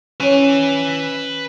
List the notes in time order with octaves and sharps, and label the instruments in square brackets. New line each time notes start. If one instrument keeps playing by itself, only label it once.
[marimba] C#4 C#5 [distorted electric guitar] B4 G#5